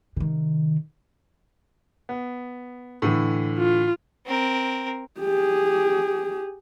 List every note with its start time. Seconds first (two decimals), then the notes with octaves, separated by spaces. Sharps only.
0.16 C3 D#3
2.09 B3
3.02 A2 D3 E3
3.58 F4
4.26 C4 A#4
5.20 G4 G#4